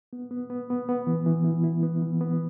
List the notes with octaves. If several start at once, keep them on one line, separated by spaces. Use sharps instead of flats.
B3
B3
B3
B3
B3
E3
E3
E4
E4
B3
E3
B3